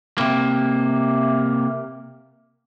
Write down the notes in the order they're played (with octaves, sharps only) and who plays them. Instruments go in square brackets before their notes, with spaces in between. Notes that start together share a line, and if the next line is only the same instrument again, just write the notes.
[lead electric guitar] C3 A#3